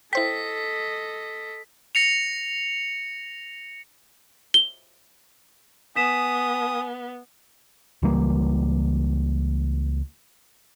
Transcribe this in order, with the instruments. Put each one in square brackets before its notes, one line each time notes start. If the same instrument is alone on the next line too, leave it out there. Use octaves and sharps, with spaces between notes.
[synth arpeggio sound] E4 C5 G5 [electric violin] A4 D#5 [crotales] B6
[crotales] A#6 C#7 F7
[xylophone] G7
[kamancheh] B3 [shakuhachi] G#5 [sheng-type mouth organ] D#6 [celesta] B6 E7
[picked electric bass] C#2 E3 G3 A#3